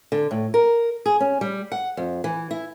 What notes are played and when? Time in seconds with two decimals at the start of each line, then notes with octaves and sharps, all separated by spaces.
0.12 D3
0.31 A2
0.54 A#4
1.06 G#4
1.20 C#4
1.41 G3
1.72 F#5
1.97 F2
2.24 E3
2.51 E4